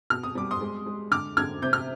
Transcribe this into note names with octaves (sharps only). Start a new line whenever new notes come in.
B2 F6
D#6
G3 D6
C6 D#6
G#3
G#3
D3 D6 F6
D3 F6 G#6
C3 G6
F6